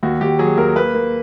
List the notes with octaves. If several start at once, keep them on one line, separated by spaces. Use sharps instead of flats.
D#2 F#4
D#2 G4
F#3 G#4
D#2 A#4
A#3 B4
A#3